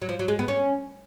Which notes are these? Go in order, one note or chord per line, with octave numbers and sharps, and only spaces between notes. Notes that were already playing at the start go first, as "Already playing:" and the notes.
F#3
F3
F#3
G#3
B3
C#4